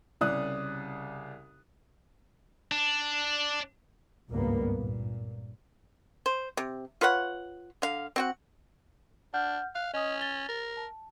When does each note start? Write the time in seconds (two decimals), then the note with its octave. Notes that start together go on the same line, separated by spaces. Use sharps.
0.21 C2 C#3 D5 D#6 F#6
2.72 D4
4.29 G#1 C#2 G2 A#3 B3
4.72 A#2
6.26 C5
6.57 C3
7.01 F4 B4 C#5 F#5
7.82 D3 F5
8.16 C4 F#4 F#5
9.34 D4 F#5 F6 G6
9.75 F5 F#6
9.94 C#4 D#5 G#5 D#6
10.21 A6 G7
10.49 A#4
10.77 A5